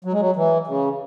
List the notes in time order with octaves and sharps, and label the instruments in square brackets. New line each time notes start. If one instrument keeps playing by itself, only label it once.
[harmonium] F#3
G#3
F#3
E3
C#3